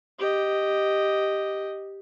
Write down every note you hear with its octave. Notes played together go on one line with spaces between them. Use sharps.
G4 D#5